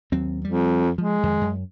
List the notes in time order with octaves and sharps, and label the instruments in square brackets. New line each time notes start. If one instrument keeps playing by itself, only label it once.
[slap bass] D#2 F#3 C4
[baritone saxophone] F2 [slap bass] G3
[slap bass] F3 [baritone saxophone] G#3
[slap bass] F2 D#3
F#2